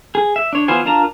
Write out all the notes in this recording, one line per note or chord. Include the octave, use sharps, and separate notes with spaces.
G#4
E5
D4 C#5
E3 B3 F4 C5 G#5
D4 F4 A#4 A5 A#5